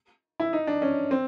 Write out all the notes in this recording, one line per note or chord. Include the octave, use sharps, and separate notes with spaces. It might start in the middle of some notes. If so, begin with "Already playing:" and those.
E4
D#4
D4
C#4
C4